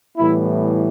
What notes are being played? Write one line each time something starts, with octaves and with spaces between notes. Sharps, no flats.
A2 E3 G3 B3 E4